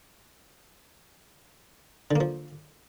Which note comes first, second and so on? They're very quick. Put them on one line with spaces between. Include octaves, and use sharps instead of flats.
D3 A#3 F3